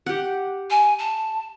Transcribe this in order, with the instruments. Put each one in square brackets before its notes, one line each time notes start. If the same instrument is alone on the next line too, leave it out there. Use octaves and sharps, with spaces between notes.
[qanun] G4 F#5
[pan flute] G#5
A5